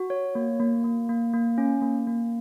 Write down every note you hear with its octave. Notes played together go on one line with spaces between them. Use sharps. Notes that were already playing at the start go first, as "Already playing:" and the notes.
Already playing: F#4
C#5
A#3
A#3
A#3
A#3
A#3
C#4
A#3
A#3